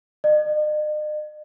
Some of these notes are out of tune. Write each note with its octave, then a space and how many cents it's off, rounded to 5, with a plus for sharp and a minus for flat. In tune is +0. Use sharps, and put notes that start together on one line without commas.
D#5 -45